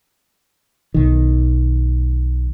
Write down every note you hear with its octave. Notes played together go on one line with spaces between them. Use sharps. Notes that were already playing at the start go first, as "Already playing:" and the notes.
B1 D#3